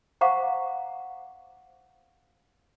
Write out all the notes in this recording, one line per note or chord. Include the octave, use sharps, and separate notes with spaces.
C5 F5 F#5 A#5 C#6 D6